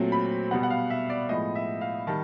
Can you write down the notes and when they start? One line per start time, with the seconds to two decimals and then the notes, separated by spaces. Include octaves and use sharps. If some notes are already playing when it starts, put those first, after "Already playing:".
Already playing: A#2 F#3 A3 C4
0.12 B5
0.51 B2 G3 B3 F#5
0.63 F#5
0.70 F5
0.90 E5
1.10 D5
1.29 A2 F3 G#3 B3 D#5
1.55 E5
1.81 F5
2.07 D#3 G3 A5